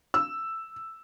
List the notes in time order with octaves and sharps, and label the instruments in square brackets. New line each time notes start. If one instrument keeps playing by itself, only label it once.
[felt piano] E6